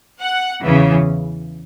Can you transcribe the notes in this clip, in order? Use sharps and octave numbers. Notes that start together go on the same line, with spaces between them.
F#5
E2 C#3 E3